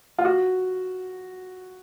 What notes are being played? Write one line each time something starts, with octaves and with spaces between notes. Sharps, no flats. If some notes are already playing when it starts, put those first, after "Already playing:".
F4
F#4